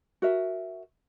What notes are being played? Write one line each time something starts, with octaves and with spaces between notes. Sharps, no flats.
F#4 A#4 E5